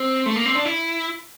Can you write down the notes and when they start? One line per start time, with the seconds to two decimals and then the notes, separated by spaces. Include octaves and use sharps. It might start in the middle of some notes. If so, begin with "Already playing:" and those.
Already playing: C4
0.26 A3
0.36 A#3
0.45 C4
0.55 D4
0.65 E4